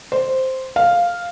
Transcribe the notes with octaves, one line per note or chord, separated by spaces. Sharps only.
C5
F5